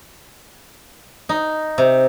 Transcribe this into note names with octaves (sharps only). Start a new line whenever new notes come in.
D#4
C3